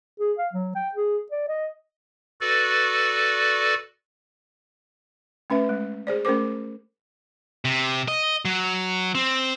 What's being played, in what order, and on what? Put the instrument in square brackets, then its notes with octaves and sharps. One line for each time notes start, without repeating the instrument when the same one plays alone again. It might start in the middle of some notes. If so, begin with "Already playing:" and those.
[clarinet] G#4
F5
F#3
G5
G#4
D5
D#5
[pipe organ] F#4 A4 B4 D5
[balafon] A3 C#4 B4 E5
G#3
G#4 C5 D5
A3 C#4 A#4 C5 D6
[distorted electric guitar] C3
D#5
F#3
C4